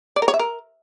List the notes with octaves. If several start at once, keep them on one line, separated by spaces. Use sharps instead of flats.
D5
A#4
C#5
E5
A#4